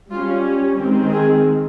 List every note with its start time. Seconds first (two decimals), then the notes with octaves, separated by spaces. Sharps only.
0.11 G3 C#4 F4
0.79 D#3 G#3 C4
1.13 G#4